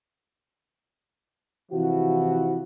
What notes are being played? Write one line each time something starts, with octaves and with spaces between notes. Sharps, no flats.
C3 E3 F3 E4 F#4